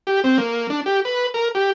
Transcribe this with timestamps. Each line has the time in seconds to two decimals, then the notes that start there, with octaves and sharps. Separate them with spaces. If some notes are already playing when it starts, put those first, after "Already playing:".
0.07 G4
0.24 C4
0.38 A#3
0.70 D4
0.86 G4
1.05 B4
1.34 A#4
1.55 G4